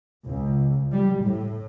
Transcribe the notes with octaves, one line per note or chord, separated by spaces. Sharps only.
C#2
G3
A2